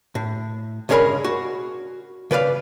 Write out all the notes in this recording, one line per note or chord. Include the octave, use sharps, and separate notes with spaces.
A2
C#2 G2 C#4 G#4 A#4 B5
F#4
C#3 B4 D5 F5